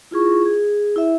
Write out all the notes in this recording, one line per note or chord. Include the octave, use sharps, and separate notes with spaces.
E4 F4 G#4 C#6
G#4
E4 E5